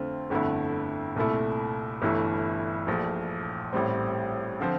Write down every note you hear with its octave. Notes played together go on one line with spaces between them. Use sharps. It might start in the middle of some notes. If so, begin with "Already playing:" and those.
Already playing: F2 D3 A3 C4 F4
G1 F2 D3 A3 E4
C2 A#2 A3 E4
G1 G2 E3 A3 E4
A#1 A#2 F3 A3
A1 A2 G3 C4
D3 F3 C4